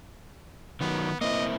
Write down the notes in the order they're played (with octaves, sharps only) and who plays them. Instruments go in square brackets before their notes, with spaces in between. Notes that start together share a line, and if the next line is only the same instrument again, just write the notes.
[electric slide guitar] D#3 F#3 [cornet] B3
[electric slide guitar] A#3 C4 E4 [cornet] D#5